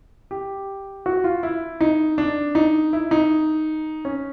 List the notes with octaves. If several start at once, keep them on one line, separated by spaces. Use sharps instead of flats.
G4
F#4
F4
E4
D#4
D4
D#4
E4
D#4
C#4